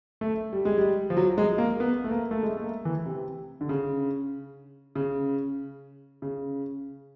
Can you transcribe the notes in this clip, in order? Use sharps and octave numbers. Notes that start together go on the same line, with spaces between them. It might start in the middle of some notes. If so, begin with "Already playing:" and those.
A3
G3
G#3
G3
F3
F#3
G#3
A#3
B3
A3
A#3
A3
G#3
A3
A#3
E3
C3
D3
C#3
C#3
C#3